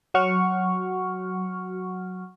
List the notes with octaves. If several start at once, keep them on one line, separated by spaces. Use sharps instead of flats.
F#3 F#4 F#5 C#6 F6